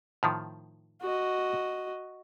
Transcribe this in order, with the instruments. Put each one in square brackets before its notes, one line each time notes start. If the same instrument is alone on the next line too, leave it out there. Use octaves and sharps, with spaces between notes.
[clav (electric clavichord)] A2 D#3 F3
[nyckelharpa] F#4 D#5